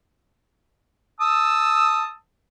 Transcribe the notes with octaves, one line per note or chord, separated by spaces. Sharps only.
A5 D#6 E6